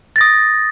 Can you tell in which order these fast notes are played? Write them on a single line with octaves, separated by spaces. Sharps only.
A6 A#6 D#6